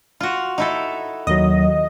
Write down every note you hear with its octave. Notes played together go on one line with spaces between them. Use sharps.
F4 F#4
D#4 E4 A4
D#2 D#3 F#3 D#5